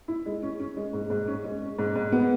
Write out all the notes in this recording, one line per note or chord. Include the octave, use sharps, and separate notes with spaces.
E4
G#3
C#4
C#4
G#3
G#2
G#2
C#4
G#3
C#4
G#2
G#2
B3